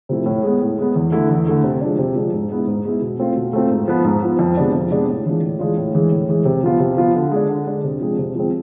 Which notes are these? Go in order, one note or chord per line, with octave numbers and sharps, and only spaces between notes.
C3 F3 A3 E4
A2
G#3 B3
A2
G#3 B3
E2
D3 A3 E4
E2
D3 A3 E4
C3
F3 G#3 D4
C3
F3 G#3 D4
G#2
G#3 B3 E4
G#2
G#3 B3 E4
B2
A3 C4 F4
B2
A3 C4 F4
G#2
F3 B3
G#2
F3 B3
F2
C3 G#3 B3 D4
F2
C3 G#3 B3 D4
A2
E3 G#3 D4 F4
A2
E3 G#3 D4 F4
A2
E3 G#3
A2
E3 G#3
C3
F3 B3 F4
C3
F3 B3 F4
D3
G#3 D4
D3
G#3 D4
C3
F3 G#3 C4
C3
F3 G#3 C4